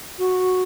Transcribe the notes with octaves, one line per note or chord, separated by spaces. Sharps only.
F#4